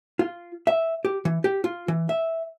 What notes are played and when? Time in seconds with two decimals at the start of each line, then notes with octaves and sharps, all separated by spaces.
0.19 F4
0.67 E5
1.05 G4
1.25 E3
1.44 G4
1.64 F4
1.88 E3
2.09 E5